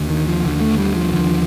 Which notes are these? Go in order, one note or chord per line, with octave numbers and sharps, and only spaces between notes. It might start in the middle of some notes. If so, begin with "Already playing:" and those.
Already playing: D#2 D3
D#3
F3
D#2 D3
A3
G3
F3
D#2 D3 F3